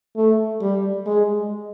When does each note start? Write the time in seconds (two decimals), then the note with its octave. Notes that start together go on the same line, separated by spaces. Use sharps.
0.16 A3
0.61 G3
1.06 G#3